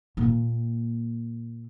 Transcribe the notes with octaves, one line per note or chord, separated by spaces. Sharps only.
A#2 A#3